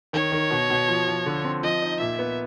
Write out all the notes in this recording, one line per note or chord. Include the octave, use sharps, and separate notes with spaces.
D#3 C#5
D#3
B2
B2
F3
F3
D3
C4
F3 D#5
D#4
A#2 E5
B3